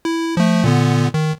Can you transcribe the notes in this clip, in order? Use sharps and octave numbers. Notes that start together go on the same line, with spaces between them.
E4
F3 A3
A#2 D3 B3
D#3